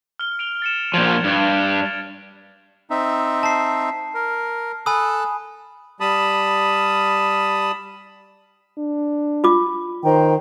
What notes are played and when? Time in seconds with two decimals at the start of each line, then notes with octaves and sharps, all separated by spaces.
0.19 F6 G7
0.39 D7 F7 G7
0.62 A6 C#7 E7
0.94 A#2 F3 G#6 D7 F7
1.24 G2
1.86 A6
2.90 C4 D#4 E5
3.43 A5 C7
4.15 A#4
4.86 A4 G#5 B5 D#6 E6 F#6
6.00 G3 A5 B5 D#6
8.78 D4
9.44 F4 D6
10.04 D#3 C5 G5 A#5